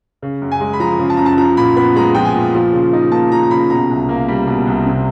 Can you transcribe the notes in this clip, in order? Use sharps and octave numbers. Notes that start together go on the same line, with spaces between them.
C#3
F#2
G#5
G#3
B5
F3 A#5
C#3
A5
F#2 A#5
A5
F3 A#5
A#2 B5
B3 B5
G#3 A#5
F3 G5
G#5
A#2
F3
C#3
D#4
A#3 A5
F3 A#5
A#5
C#3 B5
B2 A#5
C2
A#3
G3
B2
C2
C3